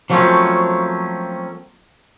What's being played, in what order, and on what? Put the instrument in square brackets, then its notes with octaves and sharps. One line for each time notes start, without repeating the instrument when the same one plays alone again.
[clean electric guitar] F3 F#3 A3 A#3 C4 C#4